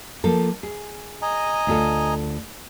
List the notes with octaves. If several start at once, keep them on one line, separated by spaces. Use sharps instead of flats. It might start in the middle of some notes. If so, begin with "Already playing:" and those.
F3 A#3 A4
G#4
D#5 G#5 A#5
D2 F4 A4